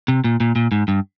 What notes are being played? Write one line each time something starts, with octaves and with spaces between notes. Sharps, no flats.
C3
A#2
A#2
A#2
G#2
G2